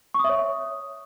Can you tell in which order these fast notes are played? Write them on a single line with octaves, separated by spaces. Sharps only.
C#6 D#6 E5 C#5